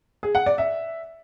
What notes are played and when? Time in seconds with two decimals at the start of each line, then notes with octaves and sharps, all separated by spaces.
0.23 G#4
0.35 F#5
0.46 D5
0.58 E5